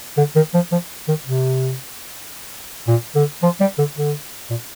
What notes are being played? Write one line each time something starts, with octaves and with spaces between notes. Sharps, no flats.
D3
D#3
F3
F3
D#3
C3
A#2
D3
F3
G3
D3
D3
A#2